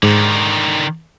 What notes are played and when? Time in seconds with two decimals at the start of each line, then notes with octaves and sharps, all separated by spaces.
0.03 G#2 D3 D#3